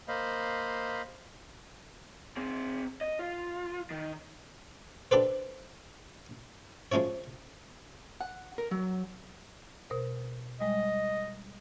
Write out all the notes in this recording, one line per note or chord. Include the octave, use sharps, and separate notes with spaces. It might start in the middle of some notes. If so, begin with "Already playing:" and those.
A#3 C5 D#5 F5 B5
C4 G#4
D#5
F4
D#3
D4 G4 A4 B4 C5
F3 G#3 C#4 E4 C#5
F#5
A#4
F#3
B2 A#4 C5
G3 G#3 D#5